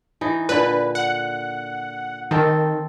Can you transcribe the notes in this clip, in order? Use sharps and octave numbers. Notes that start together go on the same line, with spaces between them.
E3 D#4
A#2 D3 B4
F#5
D#3 C4 A4